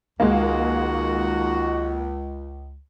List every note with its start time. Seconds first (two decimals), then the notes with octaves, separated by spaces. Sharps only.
0.20 C#2 D#3 G#3 A#3 F#4